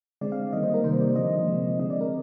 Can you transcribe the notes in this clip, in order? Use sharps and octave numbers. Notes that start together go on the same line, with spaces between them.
D3 G#3 C4 D5
F5
D#3 G3 A#3 D#5
C5
A#4
C3 D#3 G3 A#3 C5
D5
D3 F3 A#3 D#5
C3 F3 G#3 C4
D3 G#3 C4 D#5
D5
A#4